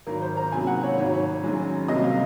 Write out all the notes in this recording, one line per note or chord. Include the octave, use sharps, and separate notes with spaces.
G#1 G#2 F#3 A#4
C5
A#5
C#2 C3 D#3 F#3 A#3 G#5
F#5
C#5
G#1 G#2 D#3 F#3 C#5
F#1 F#2 D#3 G#3
C2 C3 F#3 A#3 D#5
F5